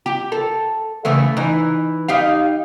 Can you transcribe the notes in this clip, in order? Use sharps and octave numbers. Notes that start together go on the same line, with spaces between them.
G4
A4
C#3 E3 A3
E3 D#4
D#4 G4 F5